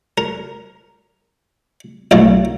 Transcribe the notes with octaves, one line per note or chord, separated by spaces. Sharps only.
A#4
B1 A2 D#3 A#3